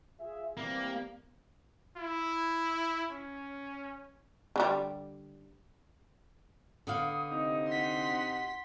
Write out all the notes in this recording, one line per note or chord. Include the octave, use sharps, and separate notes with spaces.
F4 G#4 E5
E3 G3 A#3 C4
E4
C#4
D3 F#3 G3
D3 B3 F5 D#6
C3 D#4
F#5 C6 B6